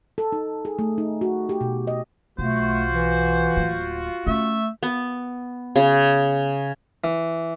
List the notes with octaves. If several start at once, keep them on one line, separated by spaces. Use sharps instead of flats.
A4
D#4
G#4
A3
D#4
F#4
G4
B2
D#5
B1 A3 F4 F#4 C5
E3
D1 A#3
A3 C#4 E5
B3
C#3
E3